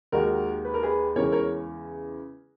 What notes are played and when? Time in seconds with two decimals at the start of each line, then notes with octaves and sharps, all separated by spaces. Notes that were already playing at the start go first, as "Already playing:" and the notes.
0.12 D#2 D#3 G#3 F#4 A#4
0.65 B4
0.74 A#4
0.83 G#4 B4
1.16 E2 C#3 G#3 A#4 C#5
1.32 A#4 C#5